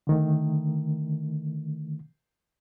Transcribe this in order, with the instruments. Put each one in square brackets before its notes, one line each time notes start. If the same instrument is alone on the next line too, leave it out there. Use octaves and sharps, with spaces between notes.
[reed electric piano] D3 D#3 A3